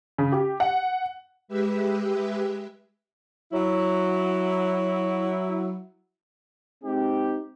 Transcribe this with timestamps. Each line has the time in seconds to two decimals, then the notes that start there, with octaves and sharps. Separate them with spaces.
0.18 C#3
0.32 G4
0.60 F#5
1.48 G#3 G4 B4 E5
3.52 F#3 E4
6.83 G#3 C4 D#4 G4